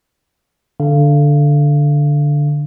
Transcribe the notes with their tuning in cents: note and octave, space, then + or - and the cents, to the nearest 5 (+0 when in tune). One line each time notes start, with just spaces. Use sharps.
D3 +0 F5 -20